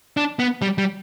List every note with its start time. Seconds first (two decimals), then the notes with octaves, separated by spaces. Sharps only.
0.17 D4
0.39 B3
0.62 G3
0.78 G3